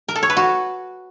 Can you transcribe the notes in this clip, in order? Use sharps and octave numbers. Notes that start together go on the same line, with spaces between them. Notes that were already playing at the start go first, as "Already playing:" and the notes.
A#4
A4
C#5
B4
F#4